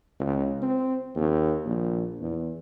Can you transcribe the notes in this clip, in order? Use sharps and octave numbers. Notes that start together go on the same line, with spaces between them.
C#2
C4
D#2
A#1
E2